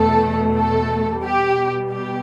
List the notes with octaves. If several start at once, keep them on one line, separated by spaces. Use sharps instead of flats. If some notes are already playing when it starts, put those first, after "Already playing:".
Already playing: E2 B2 A3 A4
A4
B2 G3 G4
G4